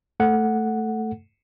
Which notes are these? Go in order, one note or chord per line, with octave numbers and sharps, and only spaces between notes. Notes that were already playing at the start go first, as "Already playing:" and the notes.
A3 A4 F#5